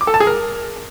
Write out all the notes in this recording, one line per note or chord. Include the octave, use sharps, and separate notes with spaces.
D6
A4
A5
G#4
A#4